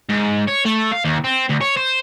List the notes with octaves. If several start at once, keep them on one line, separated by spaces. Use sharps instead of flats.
G#2
C#5
A3
F5
D#2
C4
D2
C#5
C5